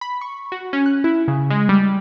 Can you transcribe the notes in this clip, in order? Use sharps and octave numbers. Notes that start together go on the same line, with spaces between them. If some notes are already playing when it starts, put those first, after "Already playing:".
B5
C#6
F#4
C#4
F#6
E4
C#3
G#3
G3